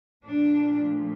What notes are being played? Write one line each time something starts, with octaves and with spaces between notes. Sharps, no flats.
A#2 F3 A3 D4